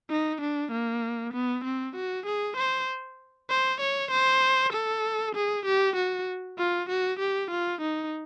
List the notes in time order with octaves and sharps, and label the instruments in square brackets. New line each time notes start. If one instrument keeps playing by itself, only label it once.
[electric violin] D#4
D4
A#3
B3
C4
F#4
G#4
C5
C5
C#5
C5
A4
G#4
G4
F#4
F4
F#4
G4
F4
D#4